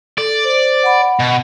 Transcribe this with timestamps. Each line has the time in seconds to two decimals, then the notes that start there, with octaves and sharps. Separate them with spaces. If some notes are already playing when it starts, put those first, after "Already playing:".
0.18 A4 D5
0.44 C5
0.83 F#5 B5
1.19 B2